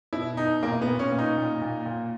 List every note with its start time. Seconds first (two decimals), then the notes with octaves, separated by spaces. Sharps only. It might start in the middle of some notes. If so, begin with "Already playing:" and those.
0.13 B2 E4
0.37 B2 D#4
0.63 A#2 A#3
0.82 B3
0.88 A#2
0.99 C#4
1.12 A#2
1.18 D#4
1.37 A#2
1.62 A#2
1.86 A#2